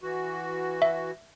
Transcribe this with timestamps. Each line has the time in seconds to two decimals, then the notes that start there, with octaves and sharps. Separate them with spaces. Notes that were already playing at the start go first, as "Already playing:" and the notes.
0.03 E3 F#4
0.82 E5